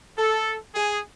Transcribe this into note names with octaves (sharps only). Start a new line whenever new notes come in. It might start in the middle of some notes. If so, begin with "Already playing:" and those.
A4
G#4